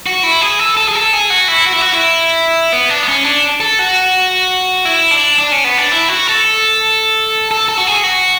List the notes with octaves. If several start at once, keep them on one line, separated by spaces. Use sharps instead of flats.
F#4
E4
G#4
A4
A4
G#4
A4
G#4
F#4
E4
F#4
E4
F#4
E4
B3
D4
B3
C#4
D4
A4
F#4
E4
D4
D4
C#4
B3
D4
E4
F#4
A4
A4
A4
F#4
G#4
F#4